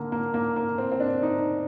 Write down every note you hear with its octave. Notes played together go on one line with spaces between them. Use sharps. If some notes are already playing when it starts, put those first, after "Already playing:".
Already playing: D3 A#3
A#3
A#3
A#3
C4
C4
D4
D#4